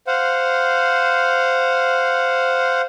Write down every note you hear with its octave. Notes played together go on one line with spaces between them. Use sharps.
C5 F5 F#5